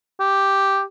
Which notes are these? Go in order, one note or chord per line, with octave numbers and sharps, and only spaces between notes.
G4